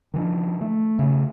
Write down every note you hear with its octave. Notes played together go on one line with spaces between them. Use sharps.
D#3 F3 D4
A3
C#3 A3